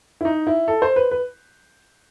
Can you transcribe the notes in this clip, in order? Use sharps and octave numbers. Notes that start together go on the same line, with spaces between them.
E4
D#4
E4
A4
C5
B4
B4